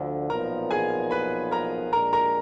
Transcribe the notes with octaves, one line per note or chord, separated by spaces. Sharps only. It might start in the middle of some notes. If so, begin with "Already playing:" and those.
Already playing: D2 D3 F3
B1 A#2 F3 B3 A#4 A#5
G#4 G#5
B4 B5
A#4 A#5
A#1 A#2 G#3 D4 A#4 A#5
A#4 A#5